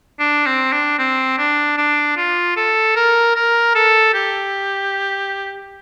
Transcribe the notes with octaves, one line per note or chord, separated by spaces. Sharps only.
D4
C4
D4
C4
D4
D4
F4
A4
A#4
A#4
A4
G4